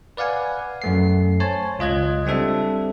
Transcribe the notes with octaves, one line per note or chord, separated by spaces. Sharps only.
B4 D5 F5 F#5 G#5
F#2 A3 C7
C5 C#5 G#5 A5
C#2 F4 D#5 F#6 G#6
G3 C4 D4 A4 E5